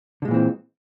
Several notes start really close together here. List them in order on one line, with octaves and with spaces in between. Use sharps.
D3 G#3 A#2 E3 C4